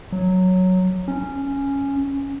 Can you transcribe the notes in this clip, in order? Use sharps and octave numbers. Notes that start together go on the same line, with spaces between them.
F#3
C#4